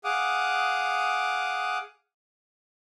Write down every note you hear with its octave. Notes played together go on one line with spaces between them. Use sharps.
G#4 F5 F#5 D6 D#6